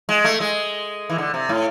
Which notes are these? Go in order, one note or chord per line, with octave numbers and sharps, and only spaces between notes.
G#3
A3
G#3
E3
D3
C3
A2